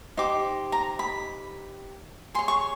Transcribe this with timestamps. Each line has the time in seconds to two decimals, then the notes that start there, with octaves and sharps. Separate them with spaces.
0.17 D#4 G4 C5 D6
0.72 A#5
0.99 B5
2.34 G#4 C6
2.39 C#5
2.48 C#6